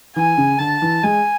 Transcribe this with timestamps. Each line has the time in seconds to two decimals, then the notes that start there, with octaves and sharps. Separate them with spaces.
0.16 E3 G#5
0.38 C#3
0.59 D3 A5
0.82 E3
1.03 G#3 G#5